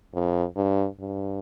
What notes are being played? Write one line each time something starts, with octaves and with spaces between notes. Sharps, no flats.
F2
G2
G2